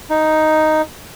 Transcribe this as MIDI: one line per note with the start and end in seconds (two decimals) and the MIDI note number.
0.10 0.82 63